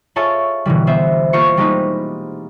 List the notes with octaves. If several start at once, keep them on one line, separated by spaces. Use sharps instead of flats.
F4 G#4 A4 C#5 E5 A5
B2 D3 E3 G3
B3 C5 E5
A#3 F4 A#4 C5 C#6
G3 G#3 A#3 C4 D#4 B4